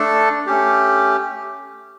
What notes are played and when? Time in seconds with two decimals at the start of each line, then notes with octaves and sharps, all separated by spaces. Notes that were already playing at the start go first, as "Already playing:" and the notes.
Already playing: A3 D4 A4
0.47 A3 C#4 G4